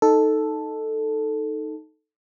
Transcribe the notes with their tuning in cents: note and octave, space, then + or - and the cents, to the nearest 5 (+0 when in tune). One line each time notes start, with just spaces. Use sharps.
D#4 +0 A4 +0